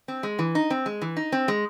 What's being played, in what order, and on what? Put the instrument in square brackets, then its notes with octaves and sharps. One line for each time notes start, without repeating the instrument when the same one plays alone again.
[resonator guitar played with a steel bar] C4
G#3
E3
D#4
C4
G#3
E3
D#4
C4
G#3